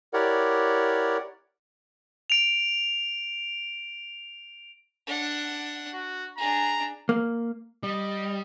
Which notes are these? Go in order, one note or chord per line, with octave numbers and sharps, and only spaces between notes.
E4 G4 A#4 C#5 D5 F#5
D7 F7
D4 F#5
F#4
D4 G#4 A#5
A#3
G3 D#5